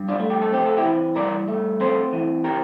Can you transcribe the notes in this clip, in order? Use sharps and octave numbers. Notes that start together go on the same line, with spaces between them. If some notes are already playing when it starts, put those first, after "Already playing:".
Already playing: G2
D4 F4
A3
G4
A4
C4 G4
A4
E4 G4
E3
G2 A#4 D5
A3
C4 A4 C5
E3
G4 A#4